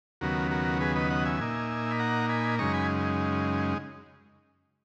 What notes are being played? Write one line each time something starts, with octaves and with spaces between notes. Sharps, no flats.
D#2 C#3 F#3 B3 F#4 A#4
F#4 A#4
G#4 B4
B4 D#5
D#5 F#5
E5 G#5
A#2 A#3 D#4
B5
F#5 A#5
G#5 B5
F#2 C#3 G#3 D#4 A#5 C#6
G#5 B5